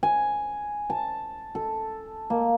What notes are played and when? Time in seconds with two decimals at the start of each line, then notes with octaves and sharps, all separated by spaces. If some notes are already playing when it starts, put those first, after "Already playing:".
0.03 G#5
0.90 A5
1.55 A4
2.30 A#3